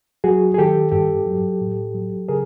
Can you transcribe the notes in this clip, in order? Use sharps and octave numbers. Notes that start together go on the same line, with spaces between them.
F#3 F#4 G#4
G#4
D#3 G4 A4
G2 G4 A4
F#3
A2
F#3
C#3 G#4 A#4